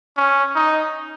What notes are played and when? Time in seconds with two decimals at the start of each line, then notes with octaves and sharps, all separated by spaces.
0.17 C#4
0.55 D#4